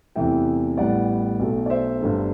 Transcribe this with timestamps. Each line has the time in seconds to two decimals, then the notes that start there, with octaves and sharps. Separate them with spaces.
0.16 E2 C3 E3 A3 E5 G5
0.78 A1 A2 G3 B3 D5 F#5
1.39 B1 B2 A3
1.66 D5
1.70 C5 E5
2.01 G1 G2 D3 A3